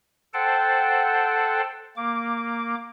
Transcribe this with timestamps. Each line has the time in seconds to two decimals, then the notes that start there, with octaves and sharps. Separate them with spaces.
0.34 A4 C5 F#5 G5 A5
1.96 A#3 D6